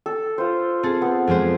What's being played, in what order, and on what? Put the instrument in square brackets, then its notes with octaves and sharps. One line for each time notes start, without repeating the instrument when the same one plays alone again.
[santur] A4
F4 C5
[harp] C4 G#4 A4
[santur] B3
[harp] F2 G#3 C5